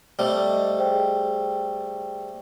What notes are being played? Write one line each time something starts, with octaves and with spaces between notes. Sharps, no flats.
G3 A3 C5 D#5
G#4 C5 G5